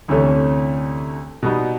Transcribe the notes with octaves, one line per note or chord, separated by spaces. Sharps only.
D2 C3 E3 A3 C#4
B2 G3 B3 D#4